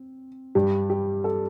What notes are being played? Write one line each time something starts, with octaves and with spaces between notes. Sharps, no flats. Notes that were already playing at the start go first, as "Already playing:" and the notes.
Already playing: C4
G2 G3 D4 G4
G4
A4